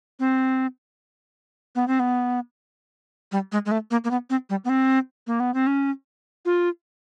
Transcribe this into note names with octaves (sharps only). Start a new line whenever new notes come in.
C4
B3
C4
B3
G3
G#3
G#3
A3
A#3
A#3
B3
C4
G3
B3
C4
A#3
B3
C4
C#4
F4